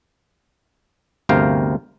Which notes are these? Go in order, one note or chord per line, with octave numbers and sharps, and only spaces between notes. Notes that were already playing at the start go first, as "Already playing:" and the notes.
G1 D2 C3 A#4 F5 G5